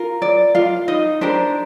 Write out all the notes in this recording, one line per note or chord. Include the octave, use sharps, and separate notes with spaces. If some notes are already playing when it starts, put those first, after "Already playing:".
Already playing: F4 A#4
D5
F4 F5
D#4 D#5
D4 G4 A#4 C5